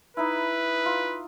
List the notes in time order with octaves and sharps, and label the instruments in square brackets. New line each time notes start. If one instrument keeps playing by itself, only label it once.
[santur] D#4 E4 [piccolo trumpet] B4
[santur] F4